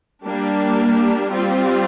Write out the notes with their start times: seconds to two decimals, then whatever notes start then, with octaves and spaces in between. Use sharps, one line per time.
0.24 G3 A#3 D4
1.31 G3 C4 F4